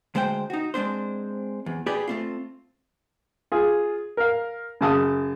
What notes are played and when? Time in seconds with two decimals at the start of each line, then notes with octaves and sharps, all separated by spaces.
0.15 D2 G#3 C5 F5 G5
0.50 D#4 F#4
0.74 G#3 C4 D4 C5
1.66 E2
1.87 G4 G#4 B4 D5
2.08 A3 C4 F4
3.52 F4 G#4
4.17 A#4 F5
4.81 F#2 C#3 A5 D#6